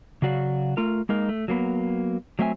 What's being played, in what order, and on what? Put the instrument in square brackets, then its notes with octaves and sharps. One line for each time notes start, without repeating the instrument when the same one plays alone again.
[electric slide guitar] C#3 F#3 F#4 D5 F5
A3 F4 A#4
G#3 A#3 D#4 A#4
A3
F#3 A#3 B3
F#3 A3 C4 E5 G5 G#5